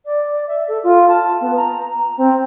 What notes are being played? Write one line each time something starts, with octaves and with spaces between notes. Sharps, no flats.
D5
E5
A4
F4
A5
B3
A#5
A#5
C4